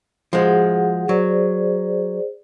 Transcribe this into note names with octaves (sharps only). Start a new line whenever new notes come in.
F3 G#3 F#4 G#4 F#5
F#3 G#4 C5 D5